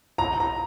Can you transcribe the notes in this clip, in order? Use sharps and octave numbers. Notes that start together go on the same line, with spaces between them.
A#5
A#5